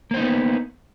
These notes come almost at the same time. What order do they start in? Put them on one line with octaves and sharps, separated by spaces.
A#3 C5 D#4 B3